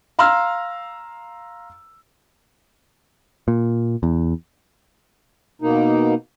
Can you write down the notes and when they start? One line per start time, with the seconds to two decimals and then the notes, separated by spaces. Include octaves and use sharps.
0.19 F5 A#5 C6 E6 F6
3.48 A#2
4.03 E2
5.62 B2 A#3 D#4